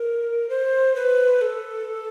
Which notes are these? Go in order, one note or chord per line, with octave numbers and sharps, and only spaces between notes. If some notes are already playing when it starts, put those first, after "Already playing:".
Already playing: A#4
C5
B4
A4